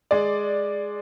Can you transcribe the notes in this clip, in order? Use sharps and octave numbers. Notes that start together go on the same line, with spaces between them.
G#3 D5